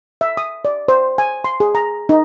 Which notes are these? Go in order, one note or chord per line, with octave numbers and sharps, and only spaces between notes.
E5
D#6
D5
C5
G#5
C6
G#4
A#5
D#4